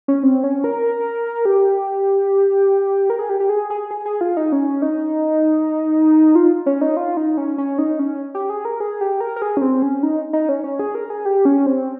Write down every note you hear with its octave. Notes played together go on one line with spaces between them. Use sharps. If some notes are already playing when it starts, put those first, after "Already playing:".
C#4
C4
C#4
A#4
G4
A#4
G#4
G4
G4
G#4
G#4
G#4
G#4
F4
D#4
C#4
D#4
F4
C#4
D#4
F4
D#4
C#4
C#4
D#4
C#4
G4
G#4
A#4
G#4
G4
A#4
A#4
G#4
C#4
C4
C#4
D#4
D#4
C#4
C#4
G#4
A#4
G#4
G4
C#4
C4